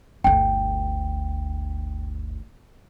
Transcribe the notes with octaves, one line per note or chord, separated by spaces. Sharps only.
G1 D2 G5